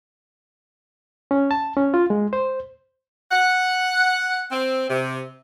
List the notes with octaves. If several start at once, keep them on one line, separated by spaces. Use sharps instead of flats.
C#4
A5
C#4
F4
G#3
C5
F#5
C4
C3